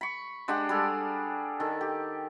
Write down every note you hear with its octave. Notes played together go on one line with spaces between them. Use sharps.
B5 C#6
G#3 D4 G4 F#5
G3 G#4 A4
D#3 A4
G4